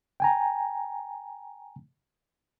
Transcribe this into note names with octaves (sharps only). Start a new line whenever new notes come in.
G5 G#5 A#5